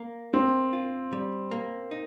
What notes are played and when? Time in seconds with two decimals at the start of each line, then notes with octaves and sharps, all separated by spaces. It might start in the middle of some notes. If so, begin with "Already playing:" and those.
Already playing: A#3
0.33 A#3 C4
0.73 F4
1.13 G3
1.51 A#3
1.91 D#4